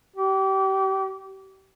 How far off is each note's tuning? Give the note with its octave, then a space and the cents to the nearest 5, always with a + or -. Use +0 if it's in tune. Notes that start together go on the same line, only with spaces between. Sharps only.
G4 -30